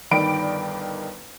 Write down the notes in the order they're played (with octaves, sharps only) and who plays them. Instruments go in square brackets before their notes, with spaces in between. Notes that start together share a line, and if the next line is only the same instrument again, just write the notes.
[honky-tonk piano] G1 D#3 D5 G5 B5 D7